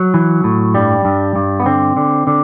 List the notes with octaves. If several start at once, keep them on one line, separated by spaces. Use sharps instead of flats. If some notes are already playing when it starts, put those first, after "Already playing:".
Already playing: F#3
E3
A2
G2 G3
G2
G2
B3
D3 C4
D3
D3